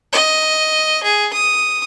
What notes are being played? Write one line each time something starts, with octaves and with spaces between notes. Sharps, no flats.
D#5
G#4
D#6